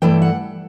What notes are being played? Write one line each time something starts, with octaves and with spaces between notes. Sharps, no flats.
G2 E3 A3 E4 G5
F#5